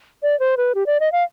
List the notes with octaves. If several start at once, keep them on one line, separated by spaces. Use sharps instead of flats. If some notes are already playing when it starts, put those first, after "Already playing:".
D5
C5
B4
G4
D5
D#5
F5